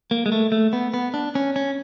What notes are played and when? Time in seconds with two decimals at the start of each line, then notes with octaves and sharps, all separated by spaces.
0.11 A#3
0.26 G#3
0.32 A3
0.52 A3
0.73 B3
0.94 B3
1.14 D4
1.35 C#4
1.56 C#4